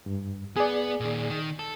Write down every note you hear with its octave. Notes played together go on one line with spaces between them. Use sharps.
G2
B3 G#4 D5
A#2 D#3
D#3
A4